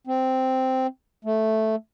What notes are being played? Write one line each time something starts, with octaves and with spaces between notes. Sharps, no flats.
C4
A3